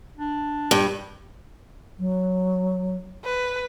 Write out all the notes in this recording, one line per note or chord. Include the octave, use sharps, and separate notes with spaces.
D4
G2
F#3
B4